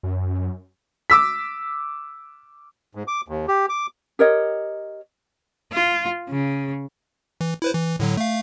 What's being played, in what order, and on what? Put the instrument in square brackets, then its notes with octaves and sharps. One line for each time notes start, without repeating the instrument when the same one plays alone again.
[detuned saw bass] F#2
[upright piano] D6 E6 B6
[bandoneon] G#2
D6
D#2
G4
D6
[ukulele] G4 A#4 C#5 D#5
[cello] F4
C#3
[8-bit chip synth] E3
E4 B4 C5
E3
A2 D3 F#3
A3 F5